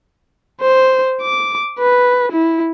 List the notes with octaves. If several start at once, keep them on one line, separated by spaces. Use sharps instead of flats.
C5
D6
B4
E4